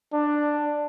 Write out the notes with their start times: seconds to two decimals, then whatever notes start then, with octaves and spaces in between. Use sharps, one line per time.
0.13 D4